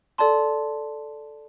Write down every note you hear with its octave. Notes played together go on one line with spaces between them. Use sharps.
A4 D5 A5 C6